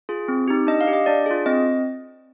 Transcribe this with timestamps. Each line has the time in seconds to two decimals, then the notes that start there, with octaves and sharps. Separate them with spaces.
0.09 F4 G#4
0.28 C4
0.48 D#4 G4
0.67 D4 D#5
0.81 F5
0.87 G4
0.93 D#5
1.06 D4 D5
1.26 F4 G#4
1.46 C4 D#5